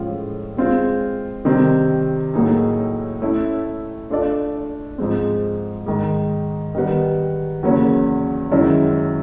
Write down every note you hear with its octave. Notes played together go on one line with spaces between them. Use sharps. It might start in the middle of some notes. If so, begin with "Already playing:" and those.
Already playing: A2 F3 G#3 C#4 F4
G#3 C4 F4
C3 D#3 G3 C4
A2 F#3 A#3 D#4 G#4
A3 C#4 E4
A3 D4 F4 A4 D5
G#2 F3 G#3 C4
G#2 D#3 G#3
D#3 G3 B3
E2 C#3 F#3 A#3 C#4
F#2 D#3 G#3 C#4 E4